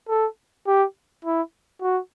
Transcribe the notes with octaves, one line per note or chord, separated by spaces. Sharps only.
A4
G4
E4
F#4